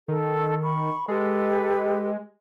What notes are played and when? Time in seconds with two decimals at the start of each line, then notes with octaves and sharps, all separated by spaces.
0.08 D#3 A4
0.63 B5 C#6
1.08 G#3 G4 A4 B4